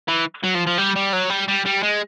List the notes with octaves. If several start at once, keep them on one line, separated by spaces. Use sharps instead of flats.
E3
F#3
F3
F3
G3
G3
F#3
G3
G3
G3
G#3